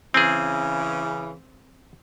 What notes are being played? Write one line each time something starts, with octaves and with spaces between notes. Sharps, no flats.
C#3 E3 C4 G#4